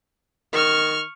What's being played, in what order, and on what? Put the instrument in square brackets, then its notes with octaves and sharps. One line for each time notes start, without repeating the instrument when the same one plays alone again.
[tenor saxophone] D#3 [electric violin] C#6 F6